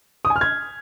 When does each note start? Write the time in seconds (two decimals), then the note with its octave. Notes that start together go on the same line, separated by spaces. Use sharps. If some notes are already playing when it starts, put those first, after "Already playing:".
0.25 D#6
0.30 G#5
0.36 F6
0.41 G#6